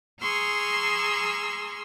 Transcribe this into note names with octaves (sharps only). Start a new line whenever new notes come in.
G#4 A#5 C6 C#6 E6 F6